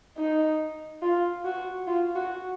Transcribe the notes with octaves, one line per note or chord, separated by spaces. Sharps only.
D#4
F4
F#4
F4
F#4